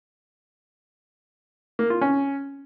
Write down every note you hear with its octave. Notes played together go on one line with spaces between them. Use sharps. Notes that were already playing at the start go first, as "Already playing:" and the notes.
A#3
F4
C#4